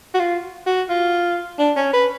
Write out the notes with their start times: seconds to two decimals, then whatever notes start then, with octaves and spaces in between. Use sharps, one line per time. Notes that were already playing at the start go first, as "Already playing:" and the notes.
0.14 F#4
0.19 F4
0.66 F#4
0.89 F4
1.59 D4
1.76 C#4
1.93 B4